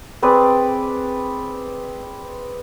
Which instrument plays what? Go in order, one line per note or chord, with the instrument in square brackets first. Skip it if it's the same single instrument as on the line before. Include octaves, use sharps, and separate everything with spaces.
[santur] C4 G#4 B4 D5